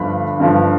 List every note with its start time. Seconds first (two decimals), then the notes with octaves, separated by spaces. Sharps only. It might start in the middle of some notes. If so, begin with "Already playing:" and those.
Already playing: G1 G2 F3 B5
0.40 G1 G2 F3